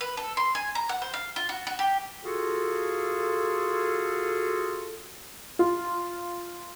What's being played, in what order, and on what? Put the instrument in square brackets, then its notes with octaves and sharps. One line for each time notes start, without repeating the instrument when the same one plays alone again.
[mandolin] B4
A4
C6
G#5
A#5
F#5
C5
F5
F4
F#4
F#4
G4
[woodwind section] F4 F#4 G#4 A4
[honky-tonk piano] F4